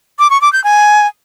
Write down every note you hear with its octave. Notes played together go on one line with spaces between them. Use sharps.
D6
C#6
D6
G6
G#5